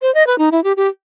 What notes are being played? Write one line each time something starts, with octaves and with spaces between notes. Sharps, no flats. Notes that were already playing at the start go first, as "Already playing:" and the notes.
C5
D#5
B4
D#4
E4
G4
G4